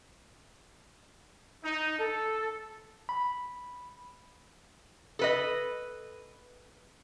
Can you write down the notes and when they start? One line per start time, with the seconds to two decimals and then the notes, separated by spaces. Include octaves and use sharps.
1.64 D#4
1.99 A4
3.09 B5
5.19 A4 B4 D#5